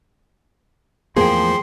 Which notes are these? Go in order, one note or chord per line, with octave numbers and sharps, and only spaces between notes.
E2 A2 F3 A#3 G#4 G5 C6